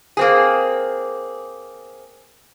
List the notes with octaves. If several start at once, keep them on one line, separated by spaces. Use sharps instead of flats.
A#3 C4 G#4